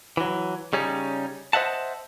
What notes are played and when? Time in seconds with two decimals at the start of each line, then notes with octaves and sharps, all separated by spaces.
0.17 E3 F#3
0.73 C#3 G3 C#4 D#4
1.53 C5 D#5 E5 F#5 A5